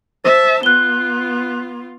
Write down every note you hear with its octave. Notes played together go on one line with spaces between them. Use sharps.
C5 E5 A5
B3 F4 F#6 G7